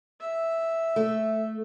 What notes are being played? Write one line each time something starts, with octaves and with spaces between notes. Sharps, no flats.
E5
A3